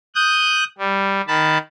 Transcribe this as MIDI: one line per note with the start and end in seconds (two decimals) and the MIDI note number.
0.15 0.64 87
0.15 0.64 90
0.15 0.64 91
0.78 1.21 55
1.28 1.58 51
1.28 1.58 81
1.28 1.58 83